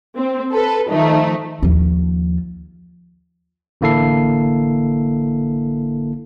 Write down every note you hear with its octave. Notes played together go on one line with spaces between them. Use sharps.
C4
A4 B4
D#3 F3 A3 D#4
D#2 F3
A1 D3 A#3 E4 A4 C7